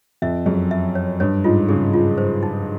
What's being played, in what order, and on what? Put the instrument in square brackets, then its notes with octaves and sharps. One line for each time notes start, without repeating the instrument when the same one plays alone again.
[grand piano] F2 [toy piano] E5
[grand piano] F#2 [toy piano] G#4
[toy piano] E5
C#5
[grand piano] G2 [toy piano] C#5
[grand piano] G#2 [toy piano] F4
[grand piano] C#3 [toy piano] G#4
[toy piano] F4
C5
D#4